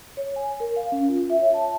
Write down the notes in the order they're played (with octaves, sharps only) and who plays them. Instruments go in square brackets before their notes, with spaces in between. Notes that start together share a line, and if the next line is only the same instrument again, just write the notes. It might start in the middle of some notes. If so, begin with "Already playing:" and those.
[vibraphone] C#5
G#5
A#4
F5
C#4
F4
E5
C#5
A5